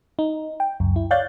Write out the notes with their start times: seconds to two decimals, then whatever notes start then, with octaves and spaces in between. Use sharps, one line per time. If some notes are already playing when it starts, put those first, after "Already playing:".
0.19 D#4
0.60 G5
0.80 C#2 F#2
0.96 E4
1.11 C#5 D5 F5 F#6 G6 A6